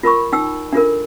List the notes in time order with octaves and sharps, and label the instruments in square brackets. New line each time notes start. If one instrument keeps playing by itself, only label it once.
[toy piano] F4 A#4 B5 C#6
D#4 G5 E6
D4 F4 A4 A#4